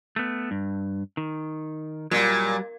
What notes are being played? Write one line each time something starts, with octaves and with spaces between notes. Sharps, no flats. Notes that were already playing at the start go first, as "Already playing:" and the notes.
A3 B3
G2
D#3
A#2 F#3 G3